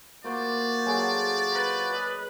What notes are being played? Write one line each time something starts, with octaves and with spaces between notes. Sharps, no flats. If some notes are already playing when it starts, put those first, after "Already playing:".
A#3 F4 F#4 C5 D5
F#3 G#4 A4
B4
D#5